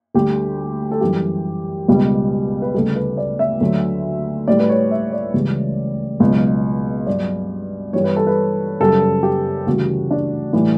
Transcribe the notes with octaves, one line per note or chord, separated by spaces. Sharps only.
D2 D3 G3 G4
A4
F#2 E3 G3 G4
C#2 B2 G3
B4
D2 C#3 G3 A4
B4
D5
E5
D2 D3 F#3
A2 G3 D5
B4
C#5
E5
D5
C#2 C#3 E3 G3
C#2 B2 F#3
G2 F#3 D5
G2 E3 G3 C#5
B4
A4
B4
F#2 C#3 G3 A4
G4
D2 C#3 E3 G3 F#4
D4
A2 E3 G3